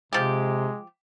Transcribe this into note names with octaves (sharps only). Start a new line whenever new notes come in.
C3 F3 G#3 G4